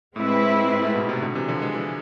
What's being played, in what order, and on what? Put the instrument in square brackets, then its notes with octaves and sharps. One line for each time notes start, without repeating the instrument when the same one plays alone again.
[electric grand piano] A2 [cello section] G#3 C4 E4 B4 E5
[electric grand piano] A2
G#2
A2
G#2 B2
A2 C3
B2 D3
C3 E3
D3 F3
E3 G#3
E3 G#3